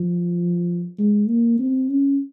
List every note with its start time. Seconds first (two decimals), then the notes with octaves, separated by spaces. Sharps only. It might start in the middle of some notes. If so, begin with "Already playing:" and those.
Already playing: F3
0.99 G#3
1.28 A#3
1.59 C4
1.89 C#4